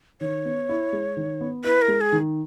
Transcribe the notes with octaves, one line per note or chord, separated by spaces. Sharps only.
D#3 C#5
B3
E4
G#3
D#3
B3
E4 B4
A#4
G#3
G#4
D#3